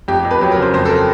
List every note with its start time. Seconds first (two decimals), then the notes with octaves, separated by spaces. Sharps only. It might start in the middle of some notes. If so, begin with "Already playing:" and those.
0.08 F2 G4
0.19 G4
0.25 F2
0.31 B4
0.41 F#3 G4
0.52 A#4
0.57 C#3 C5
0.74 F2 C5
0.85 A4
0.90 A#4